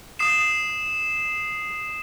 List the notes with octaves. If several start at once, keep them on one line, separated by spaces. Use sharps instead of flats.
D#6 C7 E7